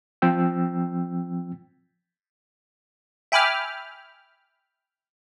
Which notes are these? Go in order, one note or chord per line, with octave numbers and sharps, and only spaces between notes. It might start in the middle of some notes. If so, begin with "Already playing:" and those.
F3 C4 G5 E6
E5 G5 G#5 B5 D6 F6